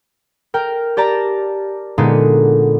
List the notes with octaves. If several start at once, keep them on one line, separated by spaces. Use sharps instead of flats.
A#4 G5
G4 D5 A5 A#5
A#2 D3 G#3 B3 D#4